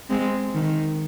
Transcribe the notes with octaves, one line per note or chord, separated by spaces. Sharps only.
G#3 C4
D#3